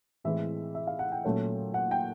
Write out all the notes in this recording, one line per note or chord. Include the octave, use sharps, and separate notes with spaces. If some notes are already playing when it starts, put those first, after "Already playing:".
A2 E3 G#3 C4 E5
E5
F5
F#5
G5
A#2 F#3 A3 C#4
F#5
G5